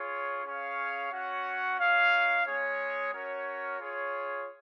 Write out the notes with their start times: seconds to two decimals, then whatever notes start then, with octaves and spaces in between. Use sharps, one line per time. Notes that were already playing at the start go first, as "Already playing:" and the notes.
Already playing: F4 G#4 C#5
0.44 C#4 G#4 C#5 F5
1.12 C#4 F#4 C#5 F#5
1.79 D#4 G#4 C#5 F5
2.46 G#3 C#4 G#4 C#5
3.13 C#4 F#4 A#4 C#5
3.80 F4 G#4 C#5